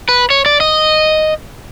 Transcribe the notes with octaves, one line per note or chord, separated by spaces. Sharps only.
B4
C#5
D5
D#5